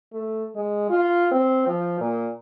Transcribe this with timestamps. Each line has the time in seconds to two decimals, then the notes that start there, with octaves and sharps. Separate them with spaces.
0.13 A3
0.56 G#3
0.90 F4
1.32 C4
1.67 F3
2.01 A#2